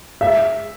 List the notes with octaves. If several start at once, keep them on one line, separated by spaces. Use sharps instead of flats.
E5